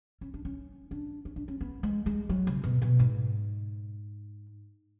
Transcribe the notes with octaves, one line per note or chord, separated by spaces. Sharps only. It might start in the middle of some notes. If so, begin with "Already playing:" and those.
C#4
D4
C#4
D4
C#4
D4
C#4
B3
G#3
G#3
F#3
C#3
B2
B2
G#2